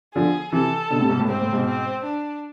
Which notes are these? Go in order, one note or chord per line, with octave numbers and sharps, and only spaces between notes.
D3 F3 G#4
C3 E3 A4
B2 D3
A2 C3
G#2 B2
A2
G#2 C4
A2
G#2 B2
C4
D4